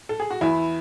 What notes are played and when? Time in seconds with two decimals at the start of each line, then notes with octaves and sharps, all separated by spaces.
0.09 A4
0.20 G#4
0.30 F#4
0.41 E2 E4